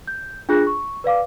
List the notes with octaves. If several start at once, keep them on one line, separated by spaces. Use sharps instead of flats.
G6
D4 F4 G#4 F#6 A#6
C#6
B4 D5 F5 D6